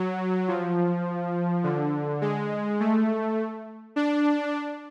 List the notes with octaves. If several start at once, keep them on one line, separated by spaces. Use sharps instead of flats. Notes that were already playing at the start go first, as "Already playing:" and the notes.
Already playing: F#3
F3
D3
G#3
A3
D4